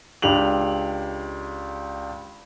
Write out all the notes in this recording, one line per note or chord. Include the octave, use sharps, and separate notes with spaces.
C#2 D4 G4 F7 F#7